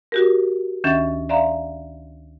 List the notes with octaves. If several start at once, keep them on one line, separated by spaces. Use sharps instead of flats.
F#4 G4 A#4
D2 D#3 C#4 E5 A6
D5 E5 F5 A#5 C6